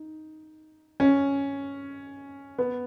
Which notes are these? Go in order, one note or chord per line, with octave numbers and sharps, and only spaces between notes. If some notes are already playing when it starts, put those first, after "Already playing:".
Already playing: D#4
C#4
B3